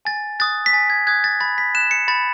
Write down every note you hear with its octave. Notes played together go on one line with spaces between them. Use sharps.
G#5 A6
D#6 F#6 A6
B6
G#5 A6
G#6
D#6 F#6 G#6
A6
B5 A6
B6
F#6 E7
C#7
B5 A6